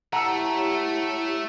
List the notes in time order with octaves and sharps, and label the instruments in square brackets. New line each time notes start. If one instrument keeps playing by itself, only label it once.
[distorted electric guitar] A3 [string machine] E4 G4 C#5 [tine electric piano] F#5 A5 E6 [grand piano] A#5